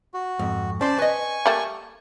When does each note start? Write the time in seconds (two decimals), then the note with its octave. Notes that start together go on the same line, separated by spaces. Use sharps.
0.14 F#4
0.39 F2 G#2
0.81 C#4 C5 D5 A5 C6
0.98 B4 D#5 G#5 C#6
1.46 G3 A3 A#3